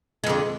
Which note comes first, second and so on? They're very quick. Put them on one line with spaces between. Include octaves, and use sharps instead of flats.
G#3 F2 D3